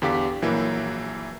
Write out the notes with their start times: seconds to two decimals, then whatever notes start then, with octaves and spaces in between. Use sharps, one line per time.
0.02 E2 D3 G4 F5 D6 B6
0.42 A#1 E3 F#3 A#3 B4